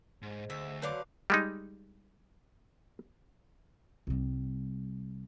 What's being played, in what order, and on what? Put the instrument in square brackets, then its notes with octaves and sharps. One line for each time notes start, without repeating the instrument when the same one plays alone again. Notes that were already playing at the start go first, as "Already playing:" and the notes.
[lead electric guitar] G#2 [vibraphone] G#4 C5 D#5
[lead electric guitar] D2 [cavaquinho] E5
[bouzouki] D3 F#3 C5 [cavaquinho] B4 F5 D6
[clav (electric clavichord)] G3 G#3 D#4
[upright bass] C2 G3